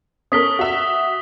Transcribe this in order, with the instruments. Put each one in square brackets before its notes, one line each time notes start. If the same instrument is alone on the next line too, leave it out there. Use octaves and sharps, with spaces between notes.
[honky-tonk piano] C#4 A4 A#4 [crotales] D#6 B6 G7
[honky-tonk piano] F#4 E5